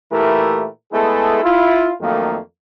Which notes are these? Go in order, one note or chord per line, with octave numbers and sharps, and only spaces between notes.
A#2 E3 A3 E4 G4 A#4
G#3 A3 B3 E4 G#4 A4
E4 F4
F2 D#3 F#3 A3 A#3